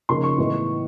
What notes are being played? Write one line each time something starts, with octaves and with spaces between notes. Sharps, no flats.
C#3 F3 A#3 D#4 C6
C#6
A2 E3 G#3 B3 E4